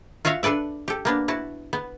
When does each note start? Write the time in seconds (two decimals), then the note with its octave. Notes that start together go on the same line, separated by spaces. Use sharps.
0.25 F4 F#4 C#5 E5 F5
0.43 D4 A4 B4 D5 E5
0.88 G4 A4
1.05 A#3 B3 D4
1.28 E4 F#4 A5
1.73 B3